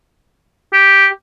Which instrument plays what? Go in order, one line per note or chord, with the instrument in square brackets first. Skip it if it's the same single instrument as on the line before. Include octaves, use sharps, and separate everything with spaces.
[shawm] G4